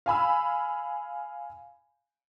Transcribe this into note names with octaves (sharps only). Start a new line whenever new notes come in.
F5 G#5 B5 E6